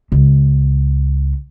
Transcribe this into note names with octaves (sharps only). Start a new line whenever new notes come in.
C#2